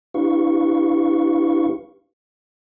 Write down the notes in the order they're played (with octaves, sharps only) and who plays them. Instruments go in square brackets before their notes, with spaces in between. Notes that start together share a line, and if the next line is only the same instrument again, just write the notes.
[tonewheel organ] D4 E4 G4 B4 F5 C#6